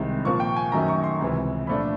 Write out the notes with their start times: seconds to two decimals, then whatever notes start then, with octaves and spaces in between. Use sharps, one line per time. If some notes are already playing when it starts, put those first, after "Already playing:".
Already playing: C2 C3 D#3 G#3
0.25 A#2 F3 A#3 C#6
0.40 G5
0.56 G#5
0.72 F#2 D#3 F#3 A3 C#4 A#5
0.88 C#6
1.04 C6
1.20 C#2 C3 E3
1.67 A#2 F3 A3 D4 B5